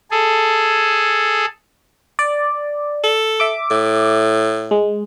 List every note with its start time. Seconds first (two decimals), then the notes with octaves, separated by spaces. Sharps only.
0.11 G#4 A4
2.19 D5
3.04 A4
3.40 E5 D6
3.71 A2
4.71 G#3